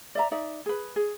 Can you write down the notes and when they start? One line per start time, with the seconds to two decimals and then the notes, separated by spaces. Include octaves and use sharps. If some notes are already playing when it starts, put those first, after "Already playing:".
0.15 D5 E5 A#5
0.32 D#4 D5 E5
0.66 G#4 B4
0.96 G#4